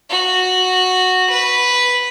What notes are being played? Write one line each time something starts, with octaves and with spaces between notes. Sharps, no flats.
F#4
B4